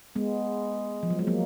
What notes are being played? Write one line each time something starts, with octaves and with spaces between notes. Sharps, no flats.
G#3 B3
F3
F#3
G#3
F#3 A#3